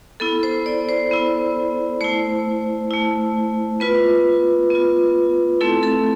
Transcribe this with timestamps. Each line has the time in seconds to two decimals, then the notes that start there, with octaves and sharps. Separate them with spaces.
0.20 B3 E4 A4
0.43 C5
0.66 D5
0.89 C5
1.11 B3 E4
2.01 A3 E4 C5
2.91 A3 E4
3.80 B3 F4 B4
4.70 B3 F4
5.61 A3 C4 E4 A4
5.83 A4